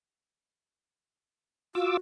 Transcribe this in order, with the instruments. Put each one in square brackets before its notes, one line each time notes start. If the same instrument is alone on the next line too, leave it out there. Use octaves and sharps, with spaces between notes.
[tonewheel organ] F4 D6 E6 [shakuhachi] F#4